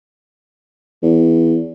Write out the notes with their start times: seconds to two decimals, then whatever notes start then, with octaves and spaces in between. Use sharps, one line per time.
1.03 E2